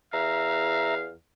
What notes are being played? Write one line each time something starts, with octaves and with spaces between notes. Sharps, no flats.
E2 E5 F5 A#5